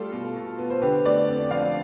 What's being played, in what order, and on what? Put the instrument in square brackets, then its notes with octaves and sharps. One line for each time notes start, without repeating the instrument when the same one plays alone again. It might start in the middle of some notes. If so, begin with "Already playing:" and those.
Already playing: [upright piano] G3 A3 F4 A4
B2
B2
B3
C5
D3 G4 B4
A3 B4 D5
F2
F3 D5 F5